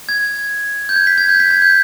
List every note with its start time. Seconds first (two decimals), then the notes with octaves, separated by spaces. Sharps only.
0.09 G#6
0.89 G6
0.96 G#6
1.07 B6
1.18 G#6
1.29 G6
1.40 B6
1.51 G#6
1.62 G6